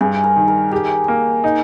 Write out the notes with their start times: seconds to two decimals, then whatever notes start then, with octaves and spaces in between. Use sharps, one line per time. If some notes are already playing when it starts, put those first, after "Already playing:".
0.01 G2 G#4
0.24 A#4
0.36 D#3
0.48 A#4
0.71 G4 G#4
1.08 A#3
1.44 D#4